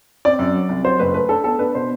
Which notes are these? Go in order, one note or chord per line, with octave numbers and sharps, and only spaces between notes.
C4 D5
F#2
F#3
C2
F#3 C5
F#1 B4
A3 B4
D4 A4
B3 A4
D4 B4
B2 C5